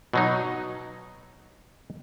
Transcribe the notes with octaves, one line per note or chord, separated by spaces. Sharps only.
B2 F#3 D#4